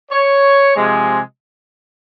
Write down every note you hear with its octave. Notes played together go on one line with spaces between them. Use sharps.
C#5
C3 F3 G#3